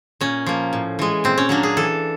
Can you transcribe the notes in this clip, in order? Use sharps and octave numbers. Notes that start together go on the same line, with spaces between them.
A#2 C#4
F3 A#3
A2
E3 G#3
A#2 C4
C#4
F#3 A#3 D4
G#4
E3 A4